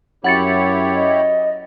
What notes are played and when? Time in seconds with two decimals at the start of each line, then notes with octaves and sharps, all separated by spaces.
0.24 F#2 E4 G4 C#5 F#5 A6 C#7
0.95 D#5